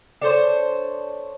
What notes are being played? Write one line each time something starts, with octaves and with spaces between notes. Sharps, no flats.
D4 A4 C5 C#5